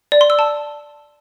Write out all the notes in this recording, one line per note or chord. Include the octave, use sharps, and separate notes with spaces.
D5
C6
E6
A5